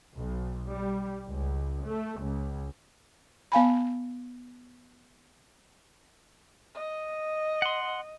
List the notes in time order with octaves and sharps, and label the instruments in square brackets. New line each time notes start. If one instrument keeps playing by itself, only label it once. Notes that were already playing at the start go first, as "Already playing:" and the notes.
[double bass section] B1
G3
C#2
A3
C#2
[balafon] B3 F5 G#5 B5
[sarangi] D#5
[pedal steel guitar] F#5 C6